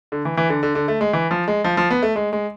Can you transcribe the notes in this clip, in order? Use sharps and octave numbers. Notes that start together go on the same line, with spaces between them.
D3
E3
E3
D3
D3
D3
A3
G#3
E3
F3
G#3
F3
F3
B3
A3
G#3
G#3